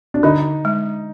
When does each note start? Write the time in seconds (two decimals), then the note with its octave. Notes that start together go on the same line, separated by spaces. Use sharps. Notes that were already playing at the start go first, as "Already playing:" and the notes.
0.14 D4
0.23 D3 D#4
0.65 G#3